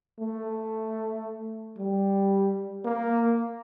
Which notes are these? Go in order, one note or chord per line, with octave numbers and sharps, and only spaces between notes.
A3
G3
A#3